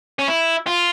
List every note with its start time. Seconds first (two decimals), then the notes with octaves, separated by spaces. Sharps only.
0.19 C#4
0.28 E4
0.67 F4